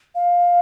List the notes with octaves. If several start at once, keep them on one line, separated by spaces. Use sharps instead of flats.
F5